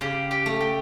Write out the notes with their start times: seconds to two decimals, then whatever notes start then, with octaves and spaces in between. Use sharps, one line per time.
0.01 C#3 G4
0.31 G4
0.46 A3
0.61 G4